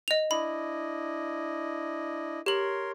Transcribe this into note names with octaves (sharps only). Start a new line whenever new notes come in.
D#5 F7
D4 E4 D#5 B5
G4 A#4 C#5 C6 F#7